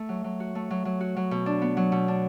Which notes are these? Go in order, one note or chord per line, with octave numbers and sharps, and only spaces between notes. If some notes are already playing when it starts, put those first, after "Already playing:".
Already playing: A3
F#3
F#3
F#4
A3
F#3
F#3
F#4
F#3
B2
D4
B3
F#3
B2
D4